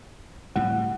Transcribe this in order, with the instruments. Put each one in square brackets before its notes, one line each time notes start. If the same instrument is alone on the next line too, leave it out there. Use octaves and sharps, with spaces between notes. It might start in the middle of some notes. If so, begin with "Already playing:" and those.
[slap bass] A2 G3 [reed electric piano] F#5